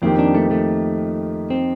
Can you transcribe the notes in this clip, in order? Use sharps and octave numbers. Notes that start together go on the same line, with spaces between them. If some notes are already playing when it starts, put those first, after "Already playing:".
F2 D#3 A#3 C4 D#4 G4
D4
A3
A3
C4